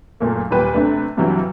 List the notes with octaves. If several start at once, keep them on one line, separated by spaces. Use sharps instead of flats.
F#1 A#2 A3 A#3
D#2 A#2 G3 G4 B4 G5
C3 A3 D4 B4
G2 C3 E3 F#3 G3